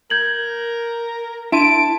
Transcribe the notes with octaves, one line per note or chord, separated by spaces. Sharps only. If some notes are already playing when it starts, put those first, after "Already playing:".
A#4 G6 G#6 F#7
D4 E4 A5 C6 D7 D#7